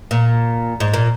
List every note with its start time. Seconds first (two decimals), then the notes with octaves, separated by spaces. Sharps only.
0.11 A#2
0.80 G#2
0.94 A#2